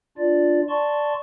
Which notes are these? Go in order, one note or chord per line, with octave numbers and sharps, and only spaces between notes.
D4 F4 D5
D5 A5 C6 C#6